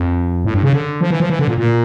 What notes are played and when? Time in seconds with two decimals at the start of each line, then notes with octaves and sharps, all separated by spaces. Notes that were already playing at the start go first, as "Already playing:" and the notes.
Already playing: F2
0.45 A2
0.54 G2
0.63 C#3
0.73 D3
1.01 F3
1.10 E3
1.20 F3
1.30 E3
1.39 D3
1.48 A#2
1.58 A#2